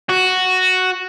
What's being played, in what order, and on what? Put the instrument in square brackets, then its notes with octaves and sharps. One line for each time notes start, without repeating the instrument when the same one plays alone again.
[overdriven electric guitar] F#4